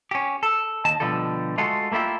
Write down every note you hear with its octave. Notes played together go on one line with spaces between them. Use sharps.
C#4 G4
A4
D#2 D#5 A5
B2 D3 F3 G3 A4
G#3 A3 F4 F#4 A4
A3 A#3 E4 F4 G4